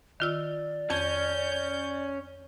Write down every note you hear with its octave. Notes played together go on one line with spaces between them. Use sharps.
D#3 F4 D5 E6
F2 C#4 A5 G6